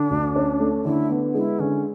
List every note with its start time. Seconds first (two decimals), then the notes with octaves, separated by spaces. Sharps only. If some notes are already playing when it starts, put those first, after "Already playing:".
Already playing: D3 D4
0.10 D2
0.36 C#4
0.60 A3
0.85 D3 E4
1.10 B3
1.34 G#3 E4
1.59 D3 C#4